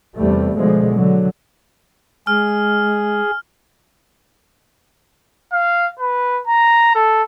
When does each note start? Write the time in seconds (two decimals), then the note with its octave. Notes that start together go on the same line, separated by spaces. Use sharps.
0.17 E2 C3 G3 A3
0.56 B2 D3 F3 G#3 A3
0.94 D3 F#3
2.27 G#3 G#4 F6
5.53 F5
5.99 B4
6.47 A#5
6.95 A4